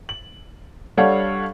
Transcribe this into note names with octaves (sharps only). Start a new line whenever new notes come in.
F#7
G3 D4 A4 C#5 F5 F#5